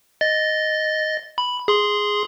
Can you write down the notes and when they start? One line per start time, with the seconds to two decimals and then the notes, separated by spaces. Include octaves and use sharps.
0.21 D#5 A6
1.38 B5
1.68 G#4 C6